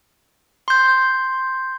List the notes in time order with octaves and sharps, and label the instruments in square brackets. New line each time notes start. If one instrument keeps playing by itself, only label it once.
[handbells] C6 G6